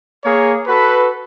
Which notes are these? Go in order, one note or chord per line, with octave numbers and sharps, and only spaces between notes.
A#3 G#4 A#4 C#5
F#4 A4 B4